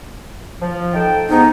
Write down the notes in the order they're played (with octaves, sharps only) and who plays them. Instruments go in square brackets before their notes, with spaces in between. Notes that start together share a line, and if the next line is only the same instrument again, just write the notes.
[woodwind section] F3
D#4 A4 G5
[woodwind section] G#2 B3 [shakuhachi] D#4